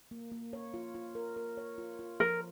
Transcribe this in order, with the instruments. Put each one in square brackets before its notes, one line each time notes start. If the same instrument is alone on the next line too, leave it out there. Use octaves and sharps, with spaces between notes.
[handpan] A#3
A#3
C#5
F4
F4
A#4
A#4
C#5
F4
F4
[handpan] F3 [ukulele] A#4